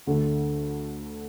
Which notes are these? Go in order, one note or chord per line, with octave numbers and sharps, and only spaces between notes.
D2 D3 A3